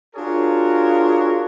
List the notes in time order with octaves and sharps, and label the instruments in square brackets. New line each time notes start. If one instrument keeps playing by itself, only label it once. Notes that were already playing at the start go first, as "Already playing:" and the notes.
[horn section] D4 F4 F#4 G#4 A#4 C#5